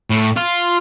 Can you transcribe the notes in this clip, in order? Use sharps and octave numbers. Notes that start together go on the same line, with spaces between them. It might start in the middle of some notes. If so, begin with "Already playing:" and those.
A2
F4